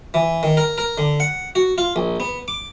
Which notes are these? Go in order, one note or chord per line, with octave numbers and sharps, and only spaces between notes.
E3
D#3
A#4
A#4
D3
F#5
F#4
F4
A#1
B3
D6